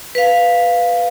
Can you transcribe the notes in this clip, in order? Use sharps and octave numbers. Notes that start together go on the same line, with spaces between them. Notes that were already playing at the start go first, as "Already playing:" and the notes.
B4 F5